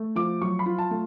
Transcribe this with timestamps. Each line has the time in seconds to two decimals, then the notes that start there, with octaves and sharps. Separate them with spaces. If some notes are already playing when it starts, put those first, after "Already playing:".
Already playing: A3
0.16 F3 D6
0.41 F#3 C#6
0.59 B5
0.66 F4
0.78 A5
0.91 A3